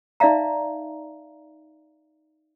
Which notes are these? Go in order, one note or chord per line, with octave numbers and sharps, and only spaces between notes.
D#4 D5 E5 F5 A#5